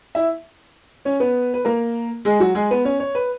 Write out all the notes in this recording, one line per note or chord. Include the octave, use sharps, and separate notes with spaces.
E4 E5
C#4 C#5
B3 B4
B4
A#3 A#4
G#3 G#4
F#3 F#4
G#3 G#4
B3 B4
C#4 C#5
C#5
B4